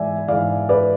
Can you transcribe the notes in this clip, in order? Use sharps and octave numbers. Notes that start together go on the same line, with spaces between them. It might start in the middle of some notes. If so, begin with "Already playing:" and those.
Already playing: G#2 E3 D5 E5 G#5
G#2 E3 D5 F5
B4 D5